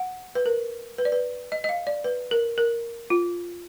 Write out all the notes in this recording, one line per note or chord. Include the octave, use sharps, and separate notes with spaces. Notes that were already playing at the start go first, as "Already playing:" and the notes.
Already playing: F#5
B4
A#4
B4
D5
B4
D#5
D#5
F5
D5
B4
A#4
A#4
F4